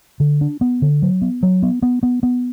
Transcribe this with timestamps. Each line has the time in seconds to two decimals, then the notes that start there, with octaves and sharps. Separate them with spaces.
0.20 D3
0.41 D4
0.61 B3
0.82 D3
1.02 F#3
1.22 B3
1.43 F#3
1.63 B3
1.82 B3
2.03 B3
2.23 B3